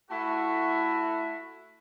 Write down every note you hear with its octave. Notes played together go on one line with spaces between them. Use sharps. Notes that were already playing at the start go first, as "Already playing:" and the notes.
A3 E4 F#4